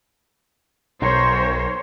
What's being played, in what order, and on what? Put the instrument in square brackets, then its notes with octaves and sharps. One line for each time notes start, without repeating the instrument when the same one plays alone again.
[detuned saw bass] B1 [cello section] A#4 C5 C#5